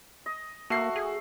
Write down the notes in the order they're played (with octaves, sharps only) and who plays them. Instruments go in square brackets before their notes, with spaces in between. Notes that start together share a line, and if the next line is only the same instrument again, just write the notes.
[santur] D#5
[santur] A3 [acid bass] A#3 [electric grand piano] F#4 C7
[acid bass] G#4